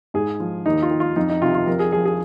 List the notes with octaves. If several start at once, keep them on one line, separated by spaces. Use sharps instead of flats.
G#2 G#4
F3
D#2 D#4
F4
D#3
F4
F2 D#4
D#4
C3 D#3 F4
F4
F2 A#4
G#4
F3 G#4
G#4